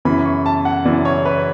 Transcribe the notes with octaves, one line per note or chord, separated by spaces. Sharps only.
F#2 C#3 E3 B5
C#6
A5
F#5
F#2 C#3 E3 D5
C#5
B4